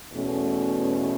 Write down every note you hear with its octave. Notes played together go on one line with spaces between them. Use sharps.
E2 B2 A3 C#4